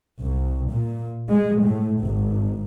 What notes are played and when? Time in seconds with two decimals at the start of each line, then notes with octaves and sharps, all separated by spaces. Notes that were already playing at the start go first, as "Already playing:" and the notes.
0.21 C2
0.71 A#2
1.29 G#3
1.62 A2
2.01 G#1